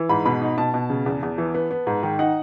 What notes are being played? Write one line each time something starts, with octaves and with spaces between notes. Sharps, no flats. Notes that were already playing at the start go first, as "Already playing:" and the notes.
Already playing: E3
G#2 B5
B2 B5
D#4
B2 A5
B2
C#3
E2
E2
E3
B3
B3
G#2
D#3
D#4 F#5